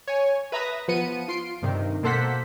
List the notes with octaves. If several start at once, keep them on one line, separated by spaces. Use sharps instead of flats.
C#5 G#5
B4 E5 A#5 B5 D#6 A#6
F3 B3 C#7 D#7
F4 C6 C7 D7
G2 C3 D#3
B2 A#3 A4 C5 F#5 B6